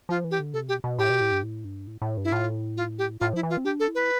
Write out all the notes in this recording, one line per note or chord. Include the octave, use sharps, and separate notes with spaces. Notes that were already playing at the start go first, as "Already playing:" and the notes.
F3 F4
E3
G4
D3
C3 A4
B2 G4
B2
A2 G4
B2
A2
G2
A2
G2
A2
A2
G2
E4
A2 F4
F4
G4
A2 F4
F3 E4
E3
F4
C4
D4 G4
A4
E4
B4